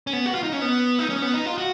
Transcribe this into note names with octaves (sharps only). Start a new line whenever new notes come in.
C#4
B3
F#4
F4
D#4
C#4
B3
D#4
C#4
B3
D#4
F4
F#4